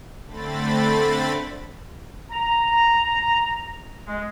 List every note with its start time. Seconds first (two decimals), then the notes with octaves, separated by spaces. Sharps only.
0.27 D3 A3 C4 B5 A6
2.30 A#5
4.07 G#3